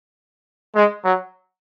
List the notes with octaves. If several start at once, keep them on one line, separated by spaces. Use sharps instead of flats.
G#3
F#3